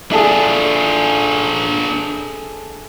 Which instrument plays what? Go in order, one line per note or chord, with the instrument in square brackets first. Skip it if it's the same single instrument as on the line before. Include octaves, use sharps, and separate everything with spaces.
[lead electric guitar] D4 F4 [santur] G#4 A4 E5